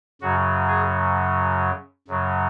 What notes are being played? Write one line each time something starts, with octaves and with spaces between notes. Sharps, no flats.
F#2 C#3 F#3 F#4
G#4
F#2 C#3 F#3